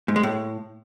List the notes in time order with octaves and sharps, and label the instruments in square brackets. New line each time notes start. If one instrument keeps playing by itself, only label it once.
[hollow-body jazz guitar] G#2
G#3
A2